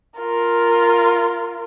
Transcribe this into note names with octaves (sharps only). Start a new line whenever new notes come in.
F4 A#4